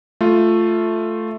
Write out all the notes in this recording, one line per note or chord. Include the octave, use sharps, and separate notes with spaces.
A3 F4